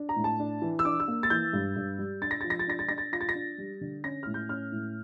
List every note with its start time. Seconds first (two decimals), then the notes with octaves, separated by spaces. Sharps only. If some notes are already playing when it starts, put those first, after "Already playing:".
Already playing: D4
0.09 A#5
0.16 A2
0.24 A5
0.39 D4
0.62 E3
0.79 E6
0.85 D4 D6
1.00 E6
1.08 A#3
1.23 A6
1.30 E3 G6
1.53 G2
1.76 G2
1.99 G3
2.22 D4 A6
2.31 A#6
2.41 F3 A6
2.50 A#6
2.59 A6
2.67 D4 A#6
2.79 A6
2.89 D4 A#6
2.98 A6
3.12 F4 A#6
3.21 A6
3.29 A#6
3.35 D4
3.58 G3
3.81 D3
4.04 C#4 A#6
4.23 A2 F6
4.34 G6
4.49 C#4 F6
4.72 A2